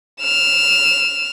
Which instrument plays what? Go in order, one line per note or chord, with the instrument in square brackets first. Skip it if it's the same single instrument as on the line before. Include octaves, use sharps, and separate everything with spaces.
[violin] F6 E7